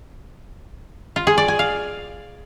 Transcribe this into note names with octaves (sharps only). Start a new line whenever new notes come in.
F4
G#4
D5
G#5
F5